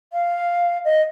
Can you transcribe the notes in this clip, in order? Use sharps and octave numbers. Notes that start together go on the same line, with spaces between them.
F5
D#5